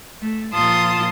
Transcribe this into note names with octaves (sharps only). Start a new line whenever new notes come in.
A3
A#2 F3 F4 A5 C6 D#6